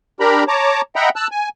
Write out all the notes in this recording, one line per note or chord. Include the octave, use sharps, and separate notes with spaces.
D4 G4 A#4 A#5 B5
C#5 A5 A#5 D6
D#5 E5 F#5 G5 A#5 B5
A5 E6 F#6
G#5